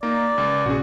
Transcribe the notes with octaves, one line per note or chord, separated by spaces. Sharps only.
A#3 D#4 D5 A#5
C#2
A#1 C#3 F#4 G#4